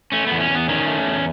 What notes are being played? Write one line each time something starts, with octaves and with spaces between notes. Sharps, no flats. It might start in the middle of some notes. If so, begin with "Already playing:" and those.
A3 C#4
B3
E2
C#4
E2 B3
D#3 C#4
A3
E2